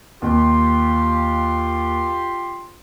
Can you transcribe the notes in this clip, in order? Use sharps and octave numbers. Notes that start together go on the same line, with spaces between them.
D#2 F4 G4 C6